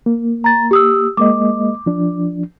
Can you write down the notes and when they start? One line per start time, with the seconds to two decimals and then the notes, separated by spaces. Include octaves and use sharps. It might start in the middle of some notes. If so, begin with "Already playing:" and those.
0.06 A#3
0.44 A#5 A6
0.71 G4 D#6 E6
1.17 G#3 A#3 D#5 D6
1.86 F3 D4